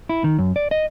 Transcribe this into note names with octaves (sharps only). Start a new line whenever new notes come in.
E4
D#3
F#2
D5
D#5